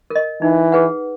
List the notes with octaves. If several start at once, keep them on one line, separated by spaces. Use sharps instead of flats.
A#4 D#5
E3 D#4
G#4 B4 F#5